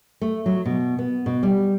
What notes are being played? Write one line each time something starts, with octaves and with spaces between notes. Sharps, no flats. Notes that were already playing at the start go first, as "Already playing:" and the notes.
A3
F#3
B2
B3
B2
G3